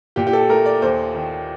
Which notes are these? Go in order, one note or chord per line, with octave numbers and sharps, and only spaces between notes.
A#2 G4
G4
A4
A3 A#4
D5
D#2 C5
D#3